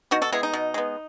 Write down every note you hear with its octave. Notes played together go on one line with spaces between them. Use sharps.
B2 D#4 F#4
F#4 A4
G#3 B3 E4 G#4
D#4
B2
G#3 B3